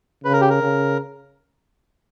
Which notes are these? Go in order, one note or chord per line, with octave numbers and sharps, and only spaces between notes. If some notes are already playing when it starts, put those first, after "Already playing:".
C#3 B4
A#4
G4
A#4
C#3